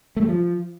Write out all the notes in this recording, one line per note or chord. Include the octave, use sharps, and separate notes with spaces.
A3
G3
F3